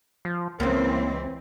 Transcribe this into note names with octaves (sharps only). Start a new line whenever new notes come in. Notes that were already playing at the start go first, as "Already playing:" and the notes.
F3
C#2 E3 A#3 C4 C#4